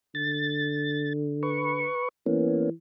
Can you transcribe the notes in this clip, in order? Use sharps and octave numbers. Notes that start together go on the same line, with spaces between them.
D3 A6
B4 C#6
E3 A#3 B3 C#4